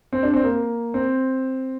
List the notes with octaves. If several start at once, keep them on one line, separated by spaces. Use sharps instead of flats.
C4
D4
C4
A#3
C4